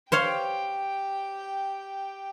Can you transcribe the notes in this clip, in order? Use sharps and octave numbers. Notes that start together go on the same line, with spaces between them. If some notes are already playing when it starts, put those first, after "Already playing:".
G4 C5 C#5 F5 G5